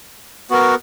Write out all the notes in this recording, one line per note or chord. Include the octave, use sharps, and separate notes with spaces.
B3 F#4 A#4